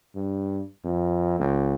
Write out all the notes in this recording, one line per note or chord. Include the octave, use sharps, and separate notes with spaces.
G2
F2
C#2